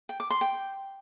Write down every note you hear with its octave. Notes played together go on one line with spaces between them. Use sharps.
G5
D6
C6
G5